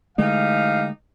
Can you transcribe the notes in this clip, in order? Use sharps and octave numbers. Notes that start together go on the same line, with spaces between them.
D3 E3 G#3 A3 D#4 G4 F5